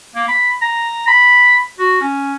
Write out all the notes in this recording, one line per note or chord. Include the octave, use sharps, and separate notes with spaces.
A#3
B5
A#5
B5
F#4
C#4